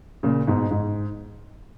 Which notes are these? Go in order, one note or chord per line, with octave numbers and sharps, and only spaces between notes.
A#2 C#3
G#2 B2
G#2